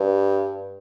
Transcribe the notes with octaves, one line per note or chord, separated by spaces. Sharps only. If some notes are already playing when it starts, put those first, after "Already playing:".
Already playing: G2